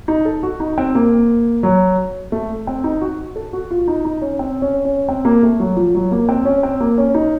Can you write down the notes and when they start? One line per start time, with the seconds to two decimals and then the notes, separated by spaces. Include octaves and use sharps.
0.08 D#4
0.25 A4
0.43 F#4
0.60 D#4
0.78 C4
0.95 A#3
1.63 F#3
2.32 A3
2.67 C4
2.84 D#4
3.01 F#4
3.36 A4
3.53 F#4
3.71 F4
3.88 D#4
4.05 D#4
4.22 C#4
4.39 C4
4.62 C#4
4.85 C#4
5.09 C4
5.25 A#3
5.43 A3
5.60 F#3
5.77 F3
5.95 F#3
6.12 A#3
6.29 C4
6.45 C#4
6.63 C4
6.80 A#3
6.98 C#4
7.14 D#4